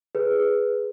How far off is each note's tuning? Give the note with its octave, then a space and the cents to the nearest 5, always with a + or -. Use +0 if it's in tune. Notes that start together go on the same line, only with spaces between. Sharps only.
G#4 +0 B4 +0